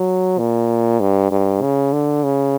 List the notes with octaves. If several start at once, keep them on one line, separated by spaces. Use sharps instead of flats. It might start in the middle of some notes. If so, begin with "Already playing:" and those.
Already playing: F#3
A#2
G2
G2
C#3
D3
C#3